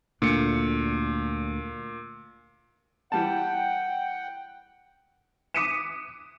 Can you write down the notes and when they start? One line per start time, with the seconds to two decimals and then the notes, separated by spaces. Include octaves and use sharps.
0.22 D2 A#2 A3 D4 C#7
3.12 E3 G3 F#5 G5 A5
5.54 D6 D#6 B6 C#7 D#7 E7